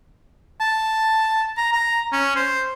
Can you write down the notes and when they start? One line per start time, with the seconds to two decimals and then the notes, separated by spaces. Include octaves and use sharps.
0.61 A5
1.58 A#5
1.72 A#5
2.12 C#4
2.36 C5